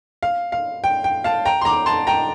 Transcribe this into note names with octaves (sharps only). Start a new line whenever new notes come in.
F5
F5
G5
G5
F5 A5
G5 A#5
C6
A#5 D6
A5 C6
G5 A#5